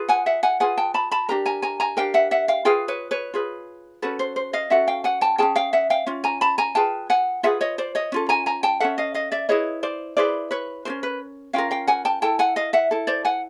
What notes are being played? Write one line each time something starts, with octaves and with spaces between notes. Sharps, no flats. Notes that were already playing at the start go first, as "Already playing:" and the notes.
Already playing: F4 G#4 B4
F#5 G#5
E5 F#5
F#5 G#5
F4 G#4 B4 F#5 G#5
G5 A5
A5 B5
A5 B5
D4 G4 A#4 A#5
G#5 A#5
G#5 A#5
G#5 A#5
D4 G4 A#4 F5 G5
E5 F#5
E5 F#5
F5 G5
F4 G#4 B4 F5 G5
B4 C#5
B4 C#5
F4 G#4 B4
C#4 F#4 A4 B4
C5
C5
D#5 F5
C#4 F#4 A4 E5 F#5
F5 G5
F#5 G#5
G5 A5
C#4 F4 G#4 G5 A5
F5 G5
E5 F#5
F5 G5
C#4 F4
G#5 A#5
A5 B5
G#5 A#5
F4 G#4 B4 G5 A5
F#5 G#5
F4 G#4 B4 E5 F#5
C#5 D#5
C5 D5
C#5 D#5
C#4 F4 A4
G#5 A#5
G#5 A#5
G5 A5
C#4 F4 A4 E5 F#5
D#5 F5
D#5 F5
D5 E5
E4 G#4 B4 C#5 D#5
C5 D5
E4 G#4 B4 C5 D5
B4 C#5
C#4 F4 A#4 C5
B4
C#4 F4 A#4 F5 G5
F5 G5
F#5 G#5
G5 A5
E4 A4 G5 A5
F#5 G#5
D#5 F5
E5 F#5
E4 A4
C5 D5
F#5 G#5